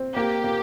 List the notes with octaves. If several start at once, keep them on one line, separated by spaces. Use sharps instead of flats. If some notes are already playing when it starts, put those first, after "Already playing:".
Already playing: C4
A#3 G4
A#3